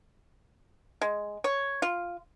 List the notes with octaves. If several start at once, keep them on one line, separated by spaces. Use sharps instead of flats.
G#3
C#5
F4